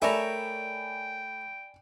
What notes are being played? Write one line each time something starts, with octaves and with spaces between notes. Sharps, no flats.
A3 A#4 C#5 D5 E5 G5 G#5 B5